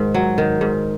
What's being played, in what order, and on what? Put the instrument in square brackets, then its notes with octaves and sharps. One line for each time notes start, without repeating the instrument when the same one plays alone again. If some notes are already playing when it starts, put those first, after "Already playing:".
Already playing: [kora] G#2 D#3
F#3
D#3
G#2